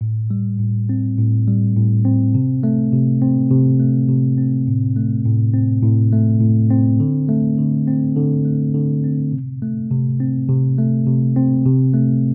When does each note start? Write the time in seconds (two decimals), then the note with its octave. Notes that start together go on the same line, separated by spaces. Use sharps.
0.01 A2
0.31 G3
0.59 A2
0.89 C4
1.18 A2
1.48 G3
1.76 A2
2.05 C4
2.35 C3
2.63 A3
2.92 C3
3.22 C4
3.50 C3
3.80 A3
4.09 C3
4.38 C4
4.67 A2
4.96 A3
5.26 A2
5.54 C4
5.83 A2
6.12 A3
6.41 A2
6.70 C4
7.00 D3
7.29 A3
7.58 D3
7.88 C4
8.17 D3
8.45 A3
8.74 D3
9.04 C4
9.32 C3
9.62 A3
9.91 C3
10.20 C4
10.49 C3
10.79 A3
11.07 C3
11.36 C4
11.66 C3
11.94 A3